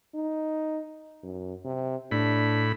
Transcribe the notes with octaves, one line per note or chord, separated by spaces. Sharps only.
D#4
F#2
C3
A2 D4 B5